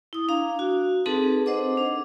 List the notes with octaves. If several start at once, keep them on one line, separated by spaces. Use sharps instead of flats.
E4 D#6
D4 F5 A#5
F#4
C4 D#4 G#4 A4 B4 A5
C5 D#5 F#5 D6
D4